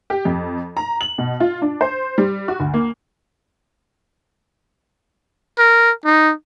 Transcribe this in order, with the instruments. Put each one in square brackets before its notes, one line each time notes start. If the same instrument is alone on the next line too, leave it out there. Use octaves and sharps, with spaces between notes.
[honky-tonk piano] G4
F2
A#5
F#7
B2
F4
D4
C5
G3
F#4
D2
A#3
[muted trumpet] A#4
D#4